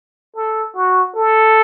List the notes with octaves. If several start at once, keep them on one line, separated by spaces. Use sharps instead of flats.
A4
F#4
A4